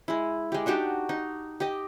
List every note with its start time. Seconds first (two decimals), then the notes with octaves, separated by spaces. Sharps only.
0.08 G#3 E4
0.52 G#3 G4
0.66 D4 D#4 F#4 G4
1.09 D#4
1.60 G4 D#5